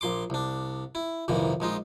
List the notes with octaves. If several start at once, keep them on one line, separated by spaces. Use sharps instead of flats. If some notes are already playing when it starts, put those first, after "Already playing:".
A#1 A#2 C6 D6
C2 D4
E4
C2 F2 A#2 D#3 E3
A#1 G#3 D#4 F4